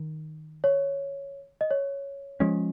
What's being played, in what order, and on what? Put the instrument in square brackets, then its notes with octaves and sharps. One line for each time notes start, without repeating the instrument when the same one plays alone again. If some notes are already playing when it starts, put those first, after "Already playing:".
Already playing: [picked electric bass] D#3
[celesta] C#5
D#5
C#5
[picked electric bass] F3 G#3 C#4